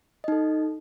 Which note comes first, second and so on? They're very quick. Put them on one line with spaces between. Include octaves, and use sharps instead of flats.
D#5 D#4 A4